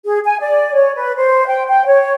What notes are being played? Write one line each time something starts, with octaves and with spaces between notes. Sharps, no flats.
G#4
G#5
D5
C#5
B4
C5
G5
G5
C#5